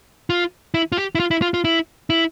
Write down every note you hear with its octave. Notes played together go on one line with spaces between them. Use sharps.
F4
E4
F4
G4
E4
F4
E4
F4
F4
E4
E4